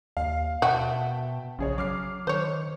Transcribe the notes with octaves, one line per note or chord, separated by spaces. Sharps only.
D#2 F5
B2 A#3 F#4 E5 G5 A5
A#1 C#3 G#4 C#5
F#3 D6 F6 C7
D#3 C5 C#5